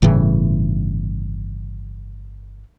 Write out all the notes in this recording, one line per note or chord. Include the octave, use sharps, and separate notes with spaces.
G1 A2 C#3 E3